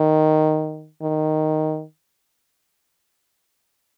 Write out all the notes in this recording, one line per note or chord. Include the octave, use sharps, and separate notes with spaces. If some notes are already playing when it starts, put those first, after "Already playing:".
Already playing: D#3
D#3